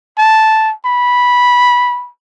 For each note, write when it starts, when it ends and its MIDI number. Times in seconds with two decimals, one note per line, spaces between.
0.18 0.73 81
0.85 2.09 83